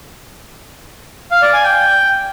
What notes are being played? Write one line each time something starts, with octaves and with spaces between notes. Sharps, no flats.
F5
D5
G#5
G5